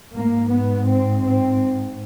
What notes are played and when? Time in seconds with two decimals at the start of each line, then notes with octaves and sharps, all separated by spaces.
0.14 G#2 A#3
0.50 B3
0.86 C4
1.21 C4